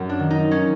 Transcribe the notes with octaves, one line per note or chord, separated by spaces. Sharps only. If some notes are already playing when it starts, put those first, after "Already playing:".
Already playing: F#2
D4
D#3
D#4
C#4